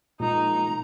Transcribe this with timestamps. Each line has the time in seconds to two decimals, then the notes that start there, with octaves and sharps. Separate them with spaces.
0.20 A#2 F3 G#3 A#3 D#4 A#5